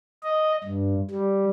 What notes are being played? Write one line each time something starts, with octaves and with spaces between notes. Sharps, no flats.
D#5
G2
G3